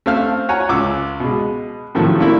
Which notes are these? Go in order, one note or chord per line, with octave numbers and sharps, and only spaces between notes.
A3 C4 F5 F6
C#5 F#5 G#5 A#5
C#2 D6 E6
B2 G#3
A2 C3 D#3 F3 F#3 A3
A3 A#3 C4 D4 E4 G4